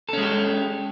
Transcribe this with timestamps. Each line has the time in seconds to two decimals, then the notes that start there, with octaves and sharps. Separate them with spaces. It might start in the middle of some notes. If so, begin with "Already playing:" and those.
0.09 A4
0.13 C#4
0.18 G#3
0.22 G4